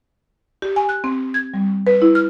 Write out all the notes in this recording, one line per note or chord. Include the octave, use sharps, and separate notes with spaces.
G4
G#5
F#6
C4
G#6
G3
B4
E4
F6